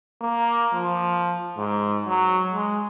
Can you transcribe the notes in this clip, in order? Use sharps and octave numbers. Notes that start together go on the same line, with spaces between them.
A#3
F3
G#2
F#3
G#3